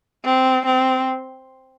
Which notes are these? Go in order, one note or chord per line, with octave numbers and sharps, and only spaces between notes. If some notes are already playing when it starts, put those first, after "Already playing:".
C4
C4